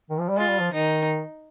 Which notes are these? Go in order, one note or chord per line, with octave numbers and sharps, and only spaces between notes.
D#3
F3
G3
G#3 F4
G3
F3
D#3 D#4